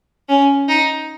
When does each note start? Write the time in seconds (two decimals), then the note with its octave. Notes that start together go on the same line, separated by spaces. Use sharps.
0.29 C#4
0.69 D#4